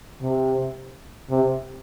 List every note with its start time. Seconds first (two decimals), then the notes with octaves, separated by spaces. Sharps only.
0.22 C3
1.30 C3